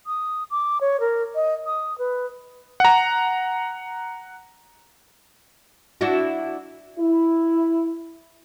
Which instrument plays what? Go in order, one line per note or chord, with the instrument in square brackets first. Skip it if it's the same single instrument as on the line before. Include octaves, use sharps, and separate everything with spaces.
[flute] D#6
D6
C#5
A#4
D#5
D#6
B4
[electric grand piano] F#5 A#5
[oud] D4 E4 F#4
[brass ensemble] E4